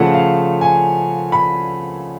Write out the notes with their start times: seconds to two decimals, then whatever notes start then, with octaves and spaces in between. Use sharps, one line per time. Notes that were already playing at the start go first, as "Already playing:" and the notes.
Already playing: C#3 F3 A3 C#4 F4 F#5
0.14 F5
0.61 G#5
1.32 B5